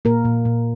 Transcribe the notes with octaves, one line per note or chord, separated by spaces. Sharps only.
A#2 A#3 A#4
A#2
A#2